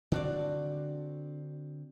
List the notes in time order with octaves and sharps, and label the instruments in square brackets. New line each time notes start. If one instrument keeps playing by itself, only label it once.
[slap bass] D3 C4 [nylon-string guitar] D4 F#4 D5